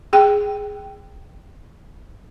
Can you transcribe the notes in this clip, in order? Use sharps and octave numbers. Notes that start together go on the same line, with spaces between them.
G#4 G5